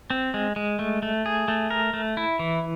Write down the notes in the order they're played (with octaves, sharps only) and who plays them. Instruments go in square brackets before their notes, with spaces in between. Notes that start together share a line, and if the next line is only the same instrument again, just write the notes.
[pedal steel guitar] C4
G#3
G#3
A3
A3
G#4
A3
A#4
A3
E4
E3